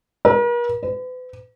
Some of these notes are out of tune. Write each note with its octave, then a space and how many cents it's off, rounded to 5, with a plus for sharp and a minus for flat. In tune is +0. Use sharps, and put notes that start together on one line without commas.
A#4 +45
B4 +40